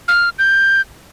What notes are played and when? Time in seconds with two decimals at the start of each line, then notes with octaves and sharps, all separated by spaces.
0.08 F6
0.39 G6